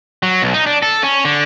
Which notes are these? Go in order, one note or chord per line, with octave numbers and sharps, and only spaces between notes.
F#3
B1
D#4
D4
A4
C#4
D3